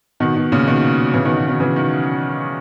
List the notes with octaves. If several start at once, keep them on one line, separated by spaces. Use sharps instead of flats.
B2 D#3
B2
A#2 C#3
B2 D#3
C#3 E3
B2 D#3
B2
B2 D#3
C#3 E3
D#3 F#3